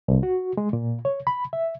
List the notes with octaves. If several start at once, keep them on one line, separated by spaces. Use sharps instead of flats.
C2
F#4
G#3
A#2
C#5
B5
E5